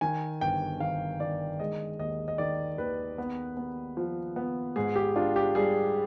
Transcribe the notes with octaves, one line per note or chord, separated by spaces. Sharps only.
D#3 G#5
G1 G5
D#3 F5
D#3 D5
G#3 D#5
D#2 D#5
D#5
D#3 D5
D#2 B4
B3
B3
F3
B3
G#2 G#4
G4
D4 F4
G4
G3 G#4